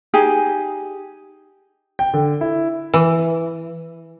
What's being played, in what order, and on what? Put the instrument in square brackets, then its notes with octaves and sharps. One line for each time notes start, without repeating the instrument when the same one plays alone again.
[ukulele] D#4 G4 G#4 G#5
[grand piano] G5
D3
E4
[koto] E3